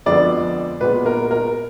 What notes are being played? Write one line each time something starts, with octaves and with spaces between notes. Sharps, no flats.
F2 D3 F3 G#3 B3 D5
A#2 G#3 B3 B4
A#4
A#4